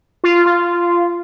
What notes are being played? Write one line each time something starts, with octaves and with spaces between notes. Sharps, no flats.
F4
F4